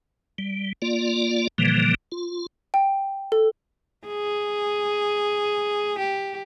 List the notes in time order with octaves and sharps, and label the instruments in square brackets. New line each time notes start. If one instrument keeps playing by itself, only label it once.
[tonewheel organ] G3
A#3 F4 D5
A#2 D3 E3 F3 G3 A#3
F4
[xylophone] G5
A4
[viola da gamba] G#4
G4